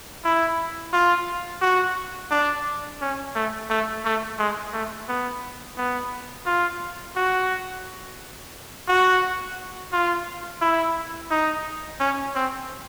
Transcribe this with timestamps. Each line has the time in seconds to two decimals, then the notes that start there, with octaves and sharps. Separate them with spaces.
0.24 E4
0.93 F4
1.62 F#4
2.31 D4
3.01 C#4
3.36 A3
3.70 A3
4.05 A3
4.39 G#3
4.73 A3
5.08 B3
5.78 B3
6.46 F4
7.16 F#4
8.88 F#4
9.93 F4
10.61 E4
11.31 D#4
12.00 C#4
12.35 C4